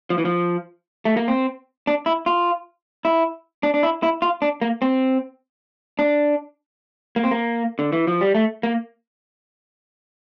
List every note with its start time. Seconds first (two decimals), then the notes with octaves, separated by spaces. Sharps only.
0.10 F3
0.18 E3
0.25 F3
1.05 A3
1.17 A#3
1.28 C4
1.87 D4
2.06 E4
2.26 F4
3.05 E4
3.63 D4
3.74 D4
3.83 E4
4.03 E4
4.22 F4
4.42 D4
4.62 A#3
4.82 C4
5.99 D4
7.16 A#3
7.24 C4
7.31 A#3
7.79 D3
7.92 E3
8.07 F3
8.21 G3
8.35 A3
8.63 A#3